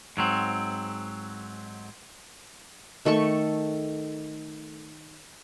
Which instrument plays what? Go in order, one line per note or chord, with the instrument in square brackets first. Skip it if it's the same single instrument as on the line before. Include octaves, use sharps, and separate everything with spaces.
[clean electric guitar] G#2 F#3 C4
[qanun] D#3 A3 A4 C#6